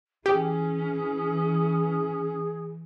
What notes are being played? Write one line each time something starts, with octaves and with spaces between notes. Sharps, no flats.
E3 C#4 G4 G#4